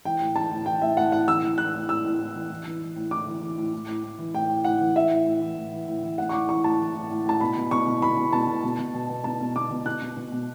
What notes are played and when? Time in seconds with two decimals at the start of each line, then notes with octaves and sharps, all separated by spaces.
0.05 E3 G5
0.21 A2
0.36 E3 A5
0.51 A2
0.66 E3 G5
0.81 A2 E5
0.97 A2 F#5
1.12 A2 F#5
1.27 E3 E6
1.43 E3
1.58 E3 F#6
1.74 A2
1.89 A2 E6
2.05 A2
2.19 A2
2.35 E3
2.50 E3
2.66 E3
2.81 E3
2.96 A2
3.11 A2 D6
3.27 E3
3.42 E3
3.58 A2
3.73 A2
3.88 A2
4.03 A2
4.19 E3
4.34 A2 G5
4.50 A2
4.64 A2 F#5
4.80 E3
4.96 E3 E5
5.11 A2
5.26 A2
5.41 E3
5.57 A2
5.73 E3
5.88 A2
6.03 E3
6.18 A2 F#5
6.29 C#6
6.33 A2 D6
6.49 E3 C#6
6.64 A2 A5
6.80 E3
6.94 A2
7.10 A2
7.26 A2 A5
7.41 B2 B5
7.57 B2
7.71 B2 C#6
7.87 B2
8.02 B2 B5
8.17 B2
8.33 B2 A5
8.48 B2
8.64 B2
8.79 B2
8.94 B2
9.10 B2
9.24 B2 A5
9.40 B2
9.56 B2 D6
9.71 B2
9.86 B2 F#6
10.02 B2
10.17 B2
10.32 B2